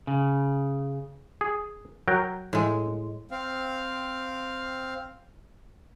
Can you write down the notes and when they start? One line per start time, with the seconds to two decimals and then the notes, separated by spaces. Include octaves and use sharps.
0.07 C#3
1.41 G#4
2.08 F#3 A#4 G5
2.53 A2 G#3
3.31 C4 F5